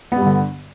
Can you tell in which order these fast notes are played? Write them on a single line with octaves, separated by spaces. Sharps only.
B3 G3 G2 D3